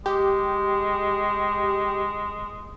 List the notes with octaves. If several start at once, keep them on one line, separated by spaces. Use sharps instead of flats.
G#3 G4